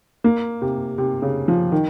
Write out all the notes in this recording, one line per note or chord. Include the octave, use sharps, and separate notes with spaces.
A#3
C3
C3
C#3
F3
D#3